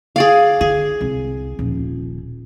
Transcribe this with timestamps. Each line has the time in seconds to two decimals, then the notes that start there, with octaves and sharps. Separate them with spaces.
0.16 G#4 D5 F5
0.61 D3 G#4
1.01 C2
1.59 D#1 F3